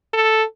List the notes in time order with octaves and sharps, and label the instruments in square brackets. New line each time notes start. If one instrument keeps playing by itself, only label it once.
[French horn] A4